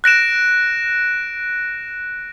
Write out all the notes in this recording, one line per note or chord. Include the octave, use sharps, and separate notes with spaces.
F#6 A#6 D7 E7